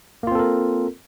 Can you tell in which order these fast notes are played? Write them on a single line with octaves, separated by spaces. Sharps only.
A#3 F4 C4 A4 A#4